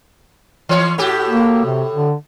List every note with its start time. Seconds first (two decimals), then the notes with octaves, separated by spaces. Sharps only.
0.69 E3 C#5
0.98 A2 F#4 G4
1.29 A#3
1.66 C3
1.95 D3